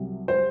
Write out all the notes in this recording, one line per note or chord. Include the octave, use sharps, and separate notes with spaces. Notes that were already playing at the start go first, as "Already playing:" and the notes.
Already playing: C2 C3 F#3
C5